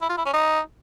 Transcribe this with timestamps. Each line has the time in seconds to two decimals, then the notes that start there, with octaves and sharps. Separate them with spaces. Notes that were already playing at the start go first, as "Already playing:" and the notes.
0.01 E4
0.09 F4
0.17 E4
0.25 C#4
0.33 D#4